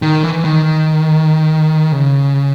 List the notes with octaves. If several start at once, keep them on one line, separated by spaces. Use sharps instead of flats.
D#3
E3
D#3
C#3